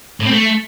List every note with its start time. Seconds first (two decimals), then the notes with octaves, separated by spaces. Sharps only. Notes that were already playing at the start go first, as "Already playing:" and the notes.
0.20 A2
0.26 C4
0.31 A3